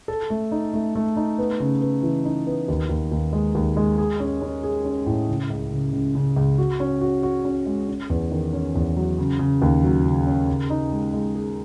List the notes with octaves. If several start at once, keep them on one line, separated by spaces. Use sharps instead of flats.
A4
A3
D#4
A3
A3
D#4
B3
C#3
B3
E3
D#4
B3
D#2
D#2
D#2
G#3
D#2
G#3
G#4
C#4
C#4
G#4
C#4
A2
C#3
C#2
C#3
C#2
C#3
C#2
F#4
C#4
F#4
F#4
C#4
G#3
C#4
E2
D#3
C#4
E2
F#3
C#3
C#3
D#2
F#3
C#3
C#4
C#3
D#4
G#3
G#3
G#4